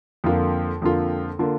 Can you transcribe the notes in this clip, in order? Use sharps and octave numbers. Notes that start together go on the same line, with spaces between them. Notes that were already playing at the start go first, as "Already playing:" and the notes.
F2 D3 A#3 F4
F2 D3 A#3 F4
D3 A#3 F4